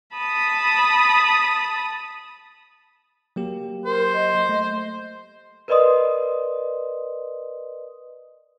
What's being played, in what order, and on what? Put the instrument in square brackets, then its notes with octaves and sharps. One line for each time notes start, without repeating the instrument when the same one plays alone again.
[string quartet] A5 B5 D#6
[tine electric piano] F#3 A#3 G4
[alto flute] A#4 [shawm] C5
[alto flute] D#5
[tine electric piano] A3
[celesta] A#4 B4 D5 D#5 C6 D#6